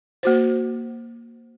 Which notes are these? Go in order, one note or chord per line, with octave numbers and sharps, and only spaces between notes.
A#3 F#4 C5